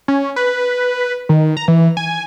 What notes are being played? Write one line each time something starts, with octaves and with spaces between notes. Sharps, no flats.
C#4
B4
D#3
A#5
E3
G#5